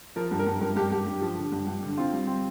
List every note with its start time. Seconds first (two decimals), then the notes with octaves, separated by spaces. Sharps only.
0.16 F3 A#4
0.31 G2
0.39 A#4
0.47 G2
0.61 G2 A#4
0.76 G2 G4
0.91 G2 G4
1.06 G2
1.22 F3
1.37 D3
1.52 G2
1.67 G2
1.83 D3
1.97 C4 F4
2.13 G3
2.27 C4